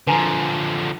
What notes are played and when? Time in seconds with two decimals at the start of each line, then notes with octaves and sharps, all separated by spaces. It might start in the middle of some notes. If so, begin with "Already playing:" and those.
0.07 D3 F3 B4 G#5 A#5